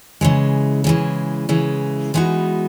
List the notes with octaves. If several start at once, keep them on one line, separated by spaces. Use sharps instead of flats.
C#3 E3 G#3
C#3 E3 G#3
C#3 E3 G#3
E3 G#3 B3 D#4 F#4